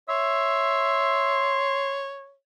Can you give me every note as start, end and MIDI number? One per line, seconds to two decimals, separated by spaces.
0.09 2.35 73
0.09 1.72 76
0.09 2.06 84